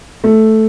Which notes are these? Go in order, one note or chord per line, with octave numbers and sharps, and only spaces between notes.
A3